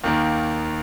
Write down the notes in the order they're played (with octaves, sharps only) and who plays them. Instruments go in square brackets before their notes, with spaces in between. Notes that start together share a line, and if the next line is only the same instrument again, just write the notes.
[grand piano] D#2 D#3 A#3